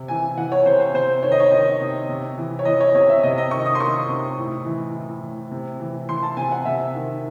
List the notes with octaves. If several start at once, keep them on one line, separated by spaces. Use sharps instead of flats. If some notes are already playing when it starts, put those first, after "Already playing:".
Already playing: C3
E3 G#5
E3 F#5
C#5
C3 C5
C5
C3 C5
D#3 C#5
D#5
C#5
D#3 D#5
C3
C3
E3
C#5
E3 D#5
C#5
C3 C#5
E5
C3 D#5
D#5
D#3 C#6
D#6
C6
D#3 C#6
C3
A2
E3
E3
A2
C3
E3
E3 C6
A5
C3 G#5
F#5
C3 E5
D#3